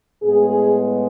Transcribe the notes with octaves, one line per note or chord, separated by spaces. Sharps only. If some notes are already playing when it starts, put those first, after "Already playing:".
A2 G#3 B3 G#4